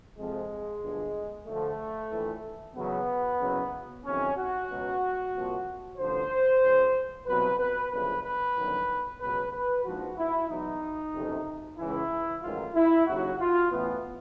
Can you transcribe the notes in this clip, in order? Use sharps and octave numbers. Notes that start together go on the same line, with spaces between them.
F2 C3 F3 G#3
G1 G2 D3 F3
D2 D3 F3 A3
A#1 A2 E3
E2 C#3 F#3 B3
F#1 F#2 C#3 F#3
F2 C3 D#3 F#3 C#4
F#4
C#2 B2 F#3
C2 A#2 F3
A1 G2 D3 F3 C5
C#2 C#3 F3
C2 B2 F#3 B4
B4
G1 F#2 C#3 F3 B4
B4
G1 F#2 D#3 F#3
C#2 B2 F#3 B4
B4
A#1 G#2 F3 F#4
E4
E2 B2 F#3 D#4
F#1 F2 C3
C#2 C#3 E3 E4
A1 G#2 D#3 F#3 F4
E4
D#2 C#3 F#3 F#4
F4
A1 A2 E3 B3